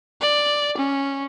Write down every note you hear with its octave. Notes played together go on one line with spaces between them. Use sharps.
D5
C#4